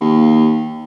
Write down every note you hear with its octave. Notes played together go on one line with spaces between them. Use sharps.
D#2